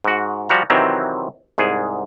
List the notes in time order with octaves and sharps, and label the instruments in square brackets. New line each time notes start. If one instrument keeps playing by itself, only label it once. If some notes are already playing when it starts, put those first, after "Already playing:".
[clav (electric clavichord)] G#2 F#4
F3 G3 F#4 A#5
C3 D#3 E3 F#3 C4
C2 G#2 G#4